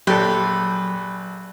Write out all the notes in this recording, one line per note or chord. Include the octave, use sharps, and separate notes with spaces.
A#1 F#3 G4 A4 B4 C6